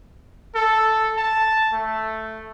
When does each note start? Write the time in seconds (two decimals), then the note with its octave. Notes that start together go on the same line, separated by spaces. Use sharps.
0.56 A4
1.18 A5
1.73 A3